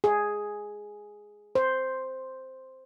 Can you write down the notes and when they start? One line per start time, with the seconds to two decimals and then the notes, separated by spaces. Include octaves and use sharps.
0.04 G#4
1.55 C5